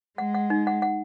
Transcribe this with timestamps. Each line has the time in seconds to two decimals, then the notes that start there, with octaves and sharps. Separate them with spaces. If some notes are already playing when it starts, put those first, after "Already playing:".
0.18 G#3 F#5
0.34 F#5
0.50 D#4
0.67 F#5
0.82 F#5